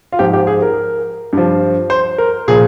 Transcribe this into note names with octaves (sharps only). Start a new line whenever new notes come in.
F4
G#2 F3 G4
G4
G#4
A#4
G2 F3
C5
A#4
A#2 F3 G#4